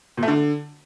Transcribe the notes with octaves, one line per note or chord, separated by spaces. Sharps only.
A#2
A3
D3